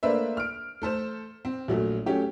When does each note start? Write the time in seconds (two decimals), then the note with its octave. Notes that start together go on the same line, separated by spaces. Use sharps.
0.03 A3 A#3 D4 B4 C5 E5
0.37 F6 D7
0.82 A3 A4 C5 E7
1.45 C4
1.68 A#1 F#3 A3
2.06 F#3 A3 C#4 G4